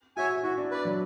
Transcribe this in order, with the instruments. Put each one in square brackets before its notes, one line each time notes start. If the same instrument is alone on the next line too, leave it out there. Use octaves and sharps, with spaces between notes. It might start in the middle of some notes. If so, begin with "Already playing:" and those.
[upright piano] F#4 [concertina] C#5 E5 G#5
[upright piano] E4 [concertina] F#4
[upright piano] D4
[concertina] B4 D5
[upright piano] F#3